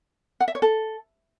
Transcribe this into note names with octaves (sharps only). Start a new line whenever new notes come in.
F#5
E5
C#5
A4